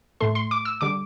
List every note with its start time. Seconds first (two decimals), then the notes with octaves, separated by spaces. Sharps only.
0.21 A2 A3 C6
0.35 C6
0.51 D6
0.65 E6
0.81 D3 G3 D6